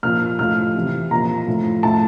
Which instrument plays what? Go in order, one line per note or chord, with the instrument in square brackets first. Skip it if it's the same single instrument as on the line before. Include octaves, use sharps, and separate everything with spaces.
[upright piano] A#2 F3 F6
A2 F3 F6
C3 E3
A#2 F3 A#5
A2 F3
A2 F3 A5